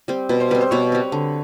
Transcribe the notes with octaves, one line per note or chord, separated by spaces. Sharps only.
G3 C4
B2 B4
C5
G3 C4 B4
C5
B2 B4 C#5
G3 C4
D3